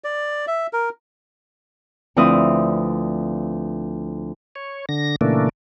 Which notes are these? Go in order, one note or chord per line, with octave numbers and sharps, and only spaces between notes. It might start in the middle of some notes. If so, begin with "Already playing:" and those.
D5
E5
A#4
D2 F3 C4 E4 B4 D#6
C#5
D3 A#6
A#2 C#3 E3 A3 A#3 D4